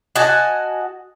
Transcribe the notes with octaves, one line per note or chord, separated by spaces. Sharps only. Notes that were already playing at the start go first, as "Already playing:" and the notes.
F#4 D#5 G#5 A5